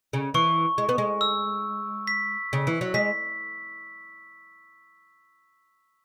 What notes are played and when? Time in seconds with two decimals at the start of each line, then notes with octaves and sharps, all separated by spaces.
0.13 C#3
0.34 E3 C#6
0.78 G#3
0.89 B3
0.98 G#3
1.21 E6
2.07 B6
2.53 C#3
2.67 E3
2.81 F#3
2.94 G#3 B6